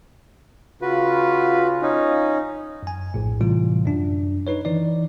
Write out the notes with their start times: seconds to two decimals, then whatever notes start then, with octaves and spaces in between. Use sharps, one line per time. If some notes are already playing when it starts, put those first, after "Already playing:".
0.82 C#3 F4 F#4 B4
1.82 C#4 D#4
2.83 F#2 G#5
3.14 A#1 A2
3.41 A2 C3 E3 G3 F4
3.86 F#2 D4
4.47 D#4 B4 C#5
4.65 D#3 E3 D#4 D5